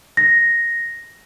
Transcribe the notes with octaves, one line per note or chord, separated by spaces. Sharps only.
A#6